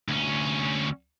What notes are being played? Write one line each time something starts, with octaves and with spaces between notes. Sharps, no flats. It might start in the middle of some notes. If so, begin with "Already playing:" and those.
D2 C#4